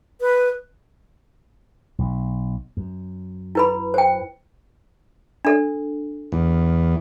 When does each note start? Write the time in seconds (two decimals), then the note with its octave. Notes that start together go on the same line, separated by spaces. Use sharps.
0.21 B4
1.99 B1
2.77 F#2
3.55 E4 B4 B5
3.94 C5 G5
5.45 D4 A4
6.32 E2